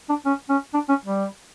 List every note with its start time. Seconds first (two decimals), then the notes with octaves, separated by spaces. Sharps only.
0.09 D4
0.25 C#4
0.49 C#4
0.74 D4
0.89 C#4
1.06 G3